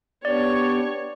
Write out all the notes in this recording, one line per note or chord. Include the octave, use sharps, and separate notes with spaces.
B3 D4 G4 C#5 D5